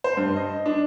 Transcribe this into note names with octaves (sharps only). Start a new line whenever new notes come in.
C5
G2
D#5
D4